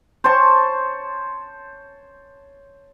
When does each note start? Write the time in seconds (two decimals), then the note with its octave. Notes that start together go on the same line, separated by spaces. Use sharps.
0.24 C5 C#5 A5